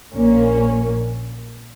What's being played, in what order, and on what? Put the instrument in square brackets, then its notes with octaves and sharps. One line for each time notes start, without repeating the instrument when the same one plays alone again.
[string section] A#1 A#2 A#3 C#4